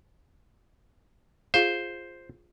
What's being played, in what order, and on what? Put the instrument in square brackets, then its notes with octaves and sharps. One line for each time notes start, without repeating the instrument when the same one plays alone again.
[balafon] F4 G#4 F5 [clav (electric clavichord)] C5